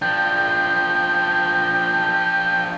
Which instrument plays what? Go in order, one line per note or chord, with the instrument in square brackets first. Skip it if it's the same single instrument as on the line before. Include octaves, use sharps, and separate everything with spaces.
[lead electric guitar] F3 D4 [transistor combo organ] G5